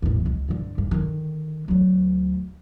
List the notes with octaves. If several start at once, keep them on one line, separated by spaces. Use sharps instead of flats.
A1 E2
C#2
G2 D3
G2
D3 D#3
D2 F#3